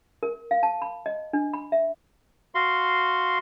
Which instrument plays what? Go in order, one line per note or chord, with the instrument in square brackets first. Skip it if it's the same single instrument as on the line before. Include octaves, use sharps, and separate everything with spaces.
[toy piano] A#4
F5
A5
B5
D#5
D4
B5
E5
[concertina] F#4 F5 C6